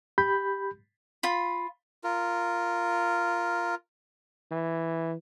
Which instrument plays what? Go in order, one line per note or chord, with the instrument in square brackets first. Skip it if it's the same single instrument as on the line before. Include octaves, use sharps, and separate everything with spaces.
[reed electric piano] G4 B5 G6
[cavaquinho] F4 B5
[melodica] F4 A#4
[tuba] E3